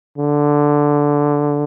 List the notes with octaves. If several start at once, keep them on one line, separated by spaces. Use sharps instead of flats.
D3